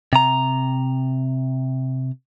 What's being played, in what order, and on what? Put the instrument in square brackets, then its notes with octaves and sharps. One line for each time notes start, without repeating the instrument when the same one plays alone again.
[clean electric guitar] C3 A#5